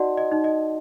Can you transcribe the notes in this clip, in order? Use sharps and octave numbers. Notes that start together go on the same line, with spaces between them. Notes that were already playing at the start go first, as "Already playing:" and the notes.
Already playing: D#4 F#4 D5 D#5 F#5 A5 C6
D#5
D#4
D#5